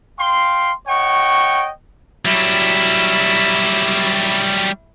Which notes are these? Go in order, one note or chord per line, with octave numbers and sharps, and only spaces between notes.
F5 G5 C6
C#5 D#5 F#5 G5 C#6
F#3 G3 E4